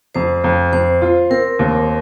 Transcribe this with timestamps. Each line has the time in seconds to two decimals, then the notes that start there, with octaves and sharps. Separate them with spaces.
0.15 F2 C5
0.44 F2
0.73 F2 C5
1.02 F4
1.30 C4 A#4
1.59 D#2